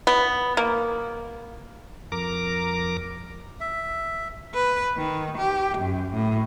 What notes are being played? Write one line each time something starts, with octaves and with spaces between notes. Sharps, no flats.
B3
A#3
F2 A#4 A#5 D6
E5
B4
D#3
G4
F#2
A2